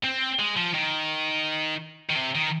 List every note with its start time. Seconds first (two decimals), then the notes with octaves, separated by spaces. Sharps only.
0.04 C4
0.40 G#3
0.57 F3
0.74 D#3
2.10 D#3
2.16 C3
2.35 D#3